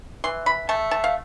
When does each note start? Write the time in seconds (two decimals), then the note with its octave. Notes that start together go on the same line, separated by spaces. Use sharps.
0.24 E3 C6
0.46 B5
0.69 A3 A5
0.91 A5
1.04 F5